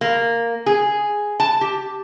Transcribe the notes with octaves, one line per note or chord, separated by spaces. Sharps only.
A#3
G#4
A5
G4